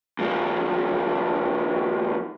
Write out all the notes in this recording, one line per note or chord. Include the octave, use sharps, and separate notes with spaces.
D#2 F3